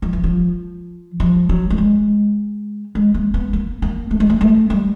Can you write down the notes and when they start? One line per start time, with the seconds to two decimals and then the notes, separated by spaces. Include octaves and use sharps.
0.02 F3
0.13 E3
0.24 F3
1.20 F3
1.49 F#3
1.70 A3
1.78 G#3
2.95 G#3
3.14 A#3
3.34 B3
3.53 A#3
3.82 A#3
4.11 A3
4.20 G#3
4.30 A3
4.41 A3
4.70 G3